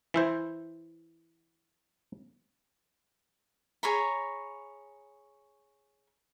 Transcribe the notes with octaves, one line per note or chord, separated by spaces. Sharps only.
E3 E4 C5
G#4 C#5 A#5 B5